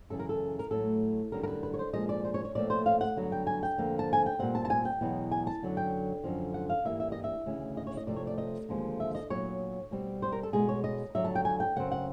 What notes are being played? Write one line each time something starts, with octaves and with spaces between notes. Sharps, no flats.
F#2 C#3 E3 A4
A#4
A4
A#4
A2 F#3 A3 A4
F#2 D3 G3 A#4
A#4
B4
B4
C#5
C5
A#2 F3 G#3 D#5
D5
C5
C#5
C#5
A#2 F3 A3 C4 D5
C5
F5
F#5
G2 D3 F#3 B3
G5
G#5
G5
F2 D3 F3 A#3
A5
G#5
G5
A#2 G3 C4 F#5
A5
A5
G#5
G5
E2 B2 F#3 B3
G#5
A5
F#2 D3 F#3
G5
F#2 D3 F3
F#5
F5
G2 E3 G3 A#3 E5
E5
D#5
E5
D2 C#3 E3
D#5
C#5
D#5
C3 F3 A3 D5
C#5
D5
D#5
D#2 D3 F3 G#3
E5
D#5
A#2 F#3 B3 C#5
B2 G3 C4
C5
A#4
A4
B2 G#3 B3 G#4
C#5
D#5
F2 D3 F#3 E5
A5
G5
G#5
G5
F#2 C#3 C4 F#5
F#5